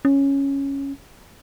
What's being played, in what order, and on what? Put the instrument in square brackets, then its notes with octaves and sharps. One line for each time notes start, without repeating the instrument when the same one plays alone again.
[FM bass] C#4